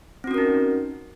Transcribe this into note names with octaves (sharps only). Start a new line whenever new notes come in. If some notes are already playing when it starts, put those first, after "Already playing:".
C4 C#4 D#4 F#4 A#4